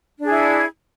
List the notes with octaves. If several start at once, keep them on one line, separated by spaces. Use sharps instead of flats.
D4 E4 G#4